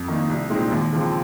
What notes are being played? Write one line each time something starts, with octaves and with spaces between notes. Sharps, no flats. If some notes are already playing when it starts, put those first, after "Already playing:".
Already playing: F2
D#3 A#3 D#4
C2
A#2 G#3 C4 D#4
D#2
C#3 F3 C4